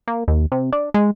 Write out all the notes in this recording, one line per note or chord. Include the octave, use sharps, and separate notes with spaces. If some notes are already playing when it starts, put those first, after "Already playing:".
A#3
D#2
C3
D4
G#3